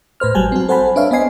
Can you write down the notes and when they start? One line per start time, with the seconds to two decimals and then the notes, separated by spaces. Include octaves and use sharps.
0.20 A2 B4 C5 F6
0.35 G#1 F#3 G3 G#5 A5
0.52 C4 F#4
0.69 A4 C5 F#5 G#5 A5 B5
0.96 D4 B4 C#5 E5 F5
1.11 B3 C5 D#5 G#5 C7